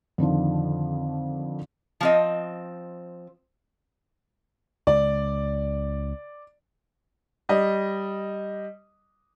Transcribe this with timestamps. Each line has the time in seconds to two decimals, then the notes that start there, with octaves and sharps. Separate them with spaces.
0.18 F2 D3 D#3 F3
2.01 F3 C4 D#5
4.87 C#2 D5
7.49 G3 D#5